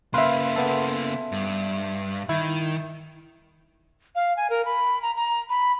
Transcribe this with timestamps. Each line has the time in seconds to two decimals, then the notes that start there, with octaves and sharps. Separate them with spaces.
0.14 C#3 A#3 B4 E5 F5 C6
0.56 B3 A4
1.32 G2
2.29 D#3 E4 G#6
4.15 F5
4.37 G#5
4.50 A#4
4.65 B5
5.02 A#5
5.16 A#5
5.50 B5